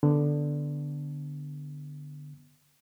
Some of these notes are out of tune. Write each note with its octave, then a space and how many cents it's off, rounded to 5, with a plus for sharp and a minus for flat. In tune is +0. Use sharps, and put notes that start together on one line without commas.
D3 +0 B3 +0